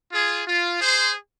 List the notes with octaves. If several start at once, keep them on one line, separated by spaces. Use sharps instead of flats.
F4 G#4
F4
G#4 C5